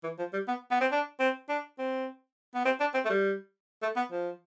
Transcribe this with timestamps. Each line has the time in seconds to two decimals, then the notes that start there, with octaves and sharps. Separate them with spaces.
0.03 E3
0.19 F3
0.33 G3
0.48 B3
0.71 B3
0.81 C4
0.91 D4
1.20 C4
1.49 D4
1.79 C4
2.55 B3
2.65 C4
2.80 D4
2.94 C4
3.05 A3
3.10 G3
3.82 A3
3.96 B3
4.12 F3